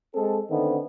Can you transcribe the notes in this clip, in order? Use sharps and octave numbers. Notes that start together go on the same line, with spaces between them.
G#3 C4 G#4 A4
D3 D#3 A3 B3 C4 D#4